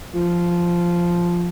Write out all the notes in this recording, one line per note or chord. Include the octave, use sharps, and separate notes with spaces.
F3